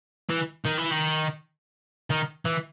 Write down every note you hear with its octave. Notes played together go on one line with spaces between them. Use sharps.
E3
D#3
E3
D#3
D#3
E3